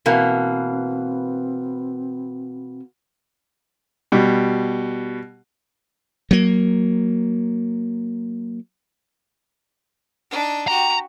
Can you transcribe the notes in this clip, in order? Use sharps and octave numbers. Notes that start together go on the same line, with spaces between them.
B2 E3 A#3 C4
B2 G3
F#3 A#3
D4 D#4
F#4 G4 A#5